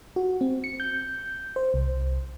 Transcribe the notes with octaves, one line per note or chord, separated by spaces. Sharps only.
F#4
C4
C#7
G6
C5
C2